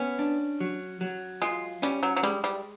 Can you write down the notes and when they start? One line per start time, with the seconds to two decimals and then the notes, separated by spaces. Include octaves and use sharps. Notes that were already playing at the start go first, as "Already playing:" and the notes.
Already playing: B3 C#4
0.19 D4
0.60 F#3
1.01 F#3
1.42 G#3 F4
1.82 G3 C#4
2.03 F#3
2.16 F#3
2.23 G3 G#3
2.44 G3